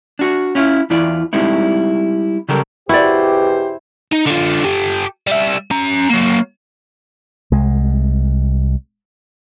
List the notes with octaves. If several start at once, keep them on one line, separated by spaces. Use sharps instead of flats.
D4 F#4
C#4 E4 F4
E2 E3 E4 F4 D5
G3 G#3 C4 D#4 E4
C#3 F#3 G3 G4 A4 A#4
E2 B2 E4 F#4 G4 C5 D5
D#4
D3 F4
G4 A4
G3 E5
C#4 A#5
F#3 A#3
C2 G#3